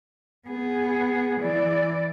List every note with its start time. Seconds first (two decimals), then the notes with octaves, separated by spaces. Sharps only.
0.48 B3 G#4
1.41 E3 D5